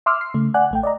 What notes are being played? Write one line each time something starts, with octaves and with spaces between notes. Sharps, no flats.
E5 C6 D6 E6 F6
C7
C#3 A3
D5 F#5 G#5 F#6
A1 A3 G5
D5 D#5 A#5